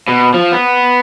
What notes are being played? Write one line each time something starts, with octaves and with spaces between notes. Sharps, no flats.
B2
F3
B3